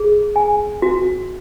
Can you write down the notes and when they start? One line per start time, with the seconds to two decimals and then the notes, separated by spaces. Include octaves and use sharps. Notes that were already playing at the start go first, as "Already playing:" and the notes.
Already playing: G#4
0.36 G#5
0.82 F#4